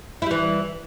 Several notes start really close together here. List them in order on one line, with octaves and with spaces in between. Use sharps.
E4 G3 E3